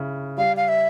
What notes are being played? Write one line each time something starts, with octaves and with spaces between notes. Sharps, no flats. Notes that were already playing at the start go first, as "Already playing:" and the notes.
Already playing: C#3 E4
G3 F5
F5
E5